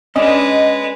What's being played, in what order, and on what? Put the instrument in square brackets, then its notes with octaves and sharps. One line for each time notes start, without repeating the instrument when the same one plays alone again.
[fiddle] G#3 B4 [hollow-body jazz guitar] C#4 D4 [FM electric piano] D#5